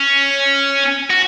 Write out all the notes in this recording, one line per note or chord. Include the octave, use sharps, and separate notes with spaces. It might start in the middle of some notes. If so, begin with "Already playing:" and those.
Already playing: C#4
F#4